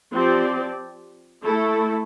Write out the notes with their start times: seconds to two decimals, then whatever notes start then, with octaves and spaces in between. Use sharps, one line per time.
0.13 F3 C4 G4 D5
1.44 A3 E4 A4